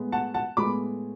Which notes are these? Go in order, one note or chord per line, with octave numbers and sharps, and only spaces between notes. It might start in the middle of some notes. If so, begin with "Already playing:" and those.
Already playing: A2 G#3 B3
F#5 A5
F#5 A5
A2 G#3 B3 B5 D6